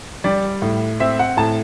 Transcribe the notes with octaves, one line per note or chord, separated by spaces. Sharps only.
G3 D5
A2
C4 E5
F#5
A2 A5